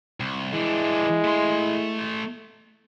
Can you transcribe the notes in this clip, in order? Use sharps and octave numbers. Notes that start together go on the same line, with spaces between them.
C2
E3 G#3 D4 E4
A3 C6